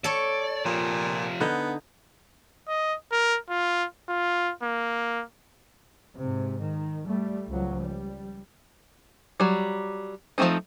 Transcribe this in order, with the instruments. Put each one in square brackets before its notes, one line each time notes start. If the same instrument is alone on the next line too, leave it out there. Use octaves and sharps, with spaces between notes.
[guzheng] A4 C#5 [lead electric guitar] D5
[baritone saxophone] A#2 [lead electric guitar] F3 G4
[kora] D3 D#4 [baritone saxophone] B3
[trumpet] D#5
A#4
F4
F4
A#3
[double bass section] G#2 C3
D#3
G3 A3
C#2 F3 F#3
G3
[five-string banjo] F#3 G3
F3 G#3 A3 C4 D#4